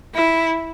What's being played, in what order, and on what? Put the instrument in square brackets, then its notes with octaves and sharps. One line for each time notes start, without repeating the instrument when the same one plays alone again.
[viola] E4